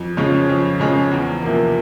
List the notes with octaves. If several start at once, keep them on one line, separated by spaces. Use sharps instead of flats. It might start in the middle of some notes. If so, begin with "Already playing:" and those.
Already playing: F2
C#3 F3 G#3 C#4
F2
C#3 F3 G#3 C#4
E2
C3 F3 A#3